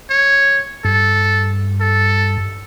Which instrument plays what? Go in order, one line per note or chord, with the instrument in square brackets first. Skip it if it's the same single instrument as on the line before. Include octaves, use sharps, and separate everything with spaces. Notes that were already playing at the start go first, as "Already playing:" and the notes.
[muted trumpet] C#5
[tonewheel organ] G2 [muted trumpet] A4
[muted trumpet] A4